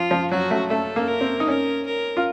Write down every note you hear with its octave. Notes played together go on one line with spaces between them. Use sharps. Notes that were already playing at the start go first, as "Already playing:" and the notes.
Already playing: F3 F4
F3
F#3 F#4
A3
A3 A4
A#3
A#4
C4
D#4
C#4 A#4
A#4
F4